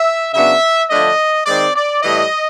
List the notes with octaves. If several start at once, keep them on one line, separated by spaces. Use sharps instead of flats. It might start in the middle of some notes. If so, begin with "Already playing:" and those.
Already playing: E5
C#3 F#3 B3 D4 E5
D3 F3 A3 D4 D#5
D#3 G#3 C4 D5
D5
A2 E3 G3 D#5